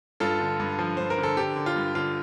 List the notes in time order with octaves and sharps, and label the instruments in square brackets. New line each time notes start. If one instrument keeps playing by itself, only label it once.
[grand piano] G2 F4 A4
D3
G2
F3
G2 C5
A#4
D3
A4
D3 G4
D3
F4
G2
D3 F4